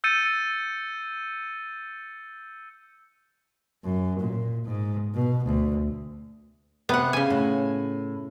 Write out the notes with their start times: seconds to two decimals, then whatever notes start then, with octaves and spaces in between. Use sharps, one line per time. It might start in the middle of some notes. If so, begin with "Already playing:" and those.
0.04 E6 G6 A6 C#7 D#7
3.84 F#2
4.19 A#2
4.65 G#2
5.14 B2
5.45 D2
6.89 C3 B3 F#5
7.13 C#3 G#5
7.30 A2